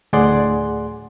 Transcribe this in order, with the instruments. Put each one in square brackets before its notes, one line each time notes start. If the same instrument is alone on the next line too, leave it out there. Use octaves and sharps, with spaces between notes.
[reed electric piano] D2 A2 G#4 D5 F#5 C6